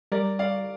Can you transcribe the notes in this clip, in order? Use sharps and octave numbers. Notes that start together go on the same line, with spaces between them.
G3 A#4 D5
D5 F5